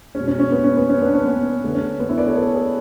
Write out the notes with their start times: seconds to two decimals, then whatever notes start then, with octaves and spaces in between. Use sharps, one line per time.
0.15 B2 G#3 C#4
0.27 C#4
0.40 C#4
0.52 B3
0.64 C#4
0.77 B3
0.89 C#4
1.01 B3 D4
1.14 C#4
1.26 B3
1.63 D3 A3
1.75 C#4
2.00 B3
2.09 C#4 E4
2.18 B4 D5
2.27 A4 C#5
2.36 G#4 B4
2.55 G#4 B4